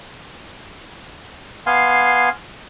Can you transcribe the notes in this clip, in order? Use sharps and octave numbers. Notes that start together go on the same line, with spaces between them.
B3 F5 G#5 C6